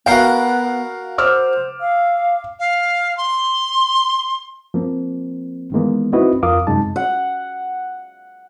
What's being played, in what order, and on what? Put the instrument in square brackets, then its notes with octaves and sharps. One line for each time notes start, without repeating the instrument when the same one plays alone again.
[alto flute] B3 [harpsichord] F#4 A#4 G5 [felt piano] F5 C7
[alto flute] C5 [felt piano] D6 E6 F6
[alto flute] F5
[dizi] F5
C6
[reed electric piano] F3 A#3 C4
D#3 E3 G#3 A#3 B3
C4 D#4 E4 F#4 B4 D#5
F2 F4 A#4 F5 D6 D#6
F#2 C3 G#3 D#4 A5
[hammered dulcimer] F#5